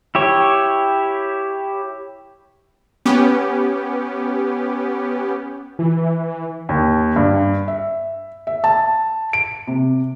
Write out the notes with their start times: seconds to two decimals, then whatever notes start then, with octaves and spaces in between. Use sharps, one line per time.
0.15 E4 G4 C#5
3.06 B3 C#4 G4
5.79 E3
6.69 D#2
7.16 G2
7.68 E5
8.47 E5
8.64 A5
9.33 D7
9.67 C3